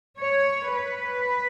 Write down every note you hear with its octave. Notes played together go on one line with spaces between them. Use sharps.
C#5
B4